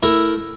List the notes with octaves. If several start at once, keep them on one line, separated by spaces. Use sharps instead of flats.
A3 E4 A#4